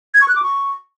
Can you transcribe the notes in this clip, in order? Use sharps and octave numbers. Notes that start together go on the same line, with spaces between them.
G#6
C#6
F#6
D6
C#6